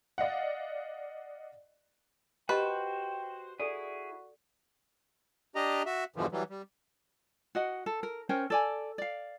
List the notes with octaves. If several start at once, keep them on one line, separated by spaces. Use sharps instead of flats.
D5 D#5 F5 F#5
F#4 G4 B4 C5 D#5 G5 A5
E4 F#4 G#4 A4 D5
D4 G4 D#5 A#5
F#4 E5
E2 G2 B2 D3 E3 F3
E3 F#3 G3
G3
F#4 D#5 F#5
A4
A#4
C#4 A#4 C5 G5
A4 D5 G#5
D5 F5